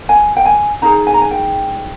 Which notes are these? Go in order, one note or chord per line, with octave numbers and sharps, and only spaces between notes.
G#5
G5
G#5
D#4 G#4 A#5
G#5
A#5
G#5
G5